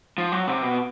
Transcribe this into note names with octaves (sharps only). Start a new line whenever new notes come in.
F3
F#3
C3
B2